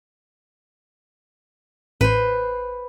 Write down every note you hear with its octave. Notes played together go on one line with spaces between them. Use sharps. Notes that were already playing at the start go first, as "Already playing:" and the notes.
A1 B4 C5